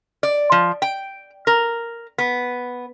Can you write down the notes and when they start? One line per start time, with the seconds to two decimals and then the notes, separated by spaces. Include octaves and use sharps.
0.23 D5
0.52 F3
0.82 G5
1.47 A#4
2.18 B3